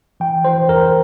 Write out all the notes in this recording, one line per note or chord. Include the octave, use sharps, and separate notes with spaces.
E3 G5
E3 C5
E2 A#4